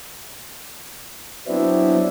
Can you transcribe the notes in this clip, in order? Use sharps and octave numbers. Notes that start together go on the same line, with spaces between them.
F#3 B3 C4 D4 E4